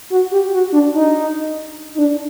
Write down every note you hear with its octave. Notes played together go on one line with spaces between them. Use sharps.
F#4
G4
F#4
D4
D#4
D#4
D4